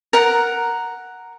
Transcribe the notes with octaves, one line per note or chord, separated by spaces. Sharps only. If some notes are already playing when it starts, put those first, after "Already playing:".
A#4 F#5 A#5